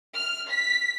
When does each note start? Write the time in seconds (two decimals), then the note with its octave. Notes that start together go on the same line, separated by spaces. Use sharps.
0.16 F6
0.50 B6